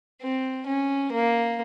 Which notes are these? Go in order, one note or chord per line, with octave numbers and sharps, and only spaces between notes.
C4
C#4
A#3